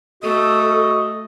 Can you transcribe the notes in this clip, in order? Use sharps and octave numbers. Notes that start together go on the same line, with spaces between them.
A3 F#4 A4 D#5